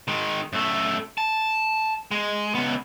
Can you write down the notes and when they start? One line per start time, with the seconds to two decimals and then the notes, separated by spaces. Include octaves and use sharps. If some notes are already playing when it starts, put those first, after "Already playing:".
0.08 D#3 G#3
0.53 F#2 A3
1.18 A5
2.11 G#3
2.55 C#2 B3